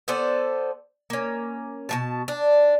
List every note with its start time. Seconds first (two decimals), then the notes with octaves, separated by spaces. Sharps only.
0.08 B3 A4 C5 D5
1.10 A#3 C#4
1.89 B2 A#3 A5
2.28 D4